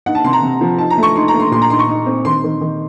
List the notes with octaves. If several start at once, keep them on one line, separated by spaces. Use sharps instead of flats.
D#4 F#5
A5
C3 C6
A#5
C3
F3
D#4 A5
A#5
A3
C#6
D#4 C6
A#5
A3
C6
A#2 C6
A#5
D#4 C6
C#6
D#4
C4
D#3 C6
D#3
D#3